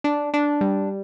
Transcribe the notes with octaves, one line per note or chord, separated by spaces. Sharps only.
D4
D4
G3